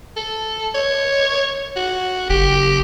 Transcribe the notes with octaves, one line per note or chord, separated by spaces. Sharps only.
A4
C#5
F#4
F#1 G4